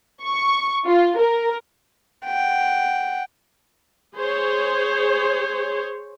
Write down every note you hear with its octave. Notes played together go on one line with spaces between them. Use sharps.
C#6
F4
A#4
F#5 G5
G#4 C5 C#5